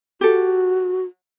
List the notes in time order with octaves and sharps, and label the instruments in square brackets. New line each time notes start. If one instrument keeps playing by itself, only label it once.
[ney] F#4 [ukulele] G4 A4